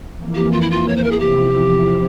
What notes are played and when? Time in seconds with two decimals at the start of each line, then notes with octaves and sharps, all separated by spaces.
0.17 F2 E3 A#3
0.35 G4
0.52 F4
0.61 E4
0.70 F4
0.88 C#5
0.96 C5
1.04 A#4
1.11 G#4
1.19 E2 C3 F3 C4 E4 G4